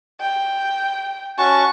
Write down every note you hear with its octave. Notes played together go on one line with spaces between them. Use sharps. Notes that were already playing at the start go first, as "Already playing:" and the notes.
G5
C#4 F#4 A5 C#6